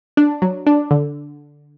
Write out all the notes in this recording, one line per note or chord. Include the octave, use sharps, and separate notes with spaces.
D4
F#3
D4
D3